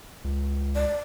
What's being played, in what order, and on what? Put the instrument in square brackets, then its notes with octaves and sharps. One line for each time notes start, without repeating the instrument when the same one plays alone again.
[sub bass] C#2
[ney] D5